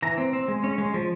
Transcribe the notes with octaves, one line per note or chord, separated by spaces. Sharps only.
E3 A#5
C4
C4
G#3
C#4
G#3
F3